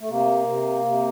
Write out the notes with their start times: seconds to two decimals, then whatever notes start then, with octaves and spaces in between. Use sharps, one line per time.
0.01 A3
0.09 C3 A#3
0.47 C3
0.85 C3